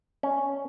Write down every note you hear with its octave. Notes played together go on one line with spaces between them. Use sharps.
C#4